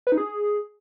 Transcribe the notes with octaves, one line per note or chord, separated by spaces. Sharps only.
B4
D#4
G#4